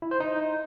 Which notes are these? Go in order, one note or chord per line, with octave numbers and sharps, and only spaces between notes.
E4
C5
D#4